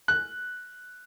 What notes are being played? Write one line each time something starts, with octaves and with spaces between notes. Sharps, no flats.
F#6